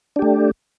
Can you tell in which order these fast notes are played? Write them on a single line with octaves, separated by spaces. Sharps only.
D4 G4 A3